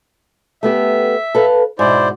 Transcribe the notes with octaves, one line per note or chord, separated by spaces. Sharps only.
A3 B3 G4 E5
A4 B4 F5
G#2 B2 E4 C5 D5